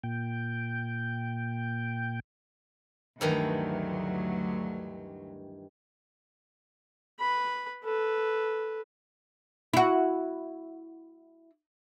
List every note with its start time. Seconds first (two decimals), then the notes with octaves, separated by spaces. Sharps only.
0.03 A#2 G5
3.21 D2 G2 D#3 E3 F#3
7.19 B4 B5
7.84 A4 B4
9.73 E4 F#4